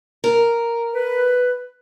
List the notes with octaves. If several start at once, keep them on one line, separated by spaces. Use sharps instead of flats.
A#4
B4